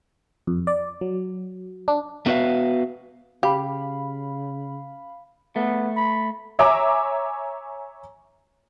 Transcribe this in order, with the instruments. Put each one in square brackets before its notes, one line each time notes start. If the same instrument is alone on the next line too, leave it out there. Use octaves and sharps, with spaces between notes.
[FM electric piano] F2
D5
F#3
D4
[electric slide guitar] A3 B3 F#4 B4 E5 F5
[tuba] C#3 [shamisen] G4 [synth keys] F5 B5
[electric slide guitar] A3 [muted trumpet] B3
[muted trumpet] B5
[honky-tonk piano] C#5 E5 G#5 A#5 D6